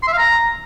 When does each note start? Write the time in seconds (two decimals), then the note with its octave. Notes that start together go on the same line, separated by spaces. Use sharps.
0.03 C6
0.08 E5
0.13 F5
0.18 A#5